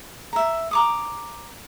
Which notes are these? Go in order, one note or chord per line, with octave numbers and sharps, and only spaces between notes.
E5 A#5
A#5 D6 D#6